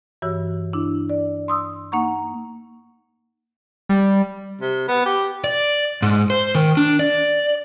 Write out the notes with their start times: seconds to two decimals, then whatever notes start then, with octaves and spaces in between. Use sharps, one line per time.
0.22 G2 E3 F#4 C#5 E6
0.73 D4 E4
1.10 D5
1.48 C6 D#6 E6
1.92 A#3 D#4 F#5 A#5 C#6
3.89 G3
4.61 C3
4.89 B3
5.06 G4
5.44 D5
6.02 G#2
6.30 C5
6.55 D#3
6.77 D4
6.99 D5